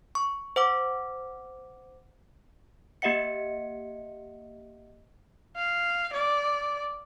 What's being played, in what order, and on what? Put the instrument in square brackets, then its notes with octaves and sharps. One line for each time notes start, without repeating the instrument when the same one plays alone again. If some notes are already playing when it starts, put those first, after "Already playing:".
[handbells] C#6
C5 F#5 D6
A#3 G4 D#5 E5 F#5 C#7
[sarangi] F5
D5